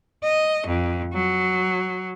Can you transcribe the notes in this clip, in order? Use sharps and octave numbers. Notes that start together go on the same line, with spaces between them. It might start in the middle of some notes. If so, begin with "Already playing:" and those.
D#5
F2
F#3